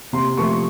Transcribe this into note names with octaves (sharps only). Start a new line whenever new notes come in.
C3 C6
F3 A3 C#6